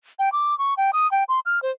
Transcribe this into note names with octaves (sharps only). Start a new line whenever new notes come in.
G5
D6
C#6
G5
D#6
G5
C6
F6
C5